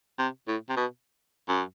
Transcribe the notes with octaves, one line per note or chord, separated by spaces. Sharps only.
C3
A2
C3
B2
F#2